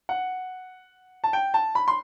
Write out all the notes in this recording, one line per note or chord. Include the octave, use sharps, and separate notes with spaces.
F#5
A5
G5
A5
B5
C6